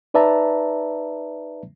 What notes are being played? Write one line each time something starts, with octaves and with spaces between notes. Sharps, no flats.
D#4 B4 D5 E5 A5 A#5